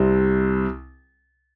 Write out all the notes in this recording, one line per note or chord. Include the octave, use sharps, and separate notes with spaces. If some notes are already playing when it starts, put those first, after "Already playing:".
Already playing: C2 C3 G3 C4